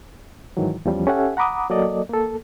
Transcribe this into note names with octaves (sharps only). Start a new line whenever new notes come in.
G#2 D#3 E3 F#3
E2 F3 G3 C#4
C#4 G4 A4 E5 F#5 G#5
F#5 A#5 B5 D6 D#6
F#3 A#3 A4 D5 D#5
A#3 A4